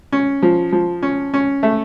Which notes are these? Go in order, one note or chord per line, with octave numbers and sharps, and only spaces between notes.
C#4
F3
F3
C#4
C#4
A3